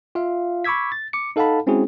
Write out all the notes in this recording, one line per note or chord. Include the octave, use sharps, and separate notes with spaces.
F4 E5 F5
B5 C#6 D6 E6 G#6 B6
A6
D6 C#7
D#4 A4 F5 F#5 A5 B5
G#3 C4 C#4 E4 F#4 G#4